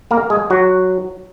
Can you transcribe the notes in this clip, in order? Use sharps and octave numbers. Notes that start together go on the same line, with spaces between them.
A#3 A#4
G#3 G#4
F#3 F#4